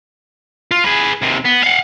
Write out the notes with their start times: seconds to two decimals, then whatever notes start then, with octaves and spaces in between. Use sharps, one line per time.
0.71 F4
0.84 G#4 B4
1.22 D#2 C3
1.45 B3
1.64 F5 F#5